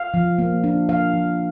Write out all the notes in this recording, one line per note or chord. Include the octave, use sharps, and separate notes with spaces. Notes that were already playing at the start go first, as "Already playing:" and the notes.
Already playing: F5
F3
A#3
D4
F3 F5
F3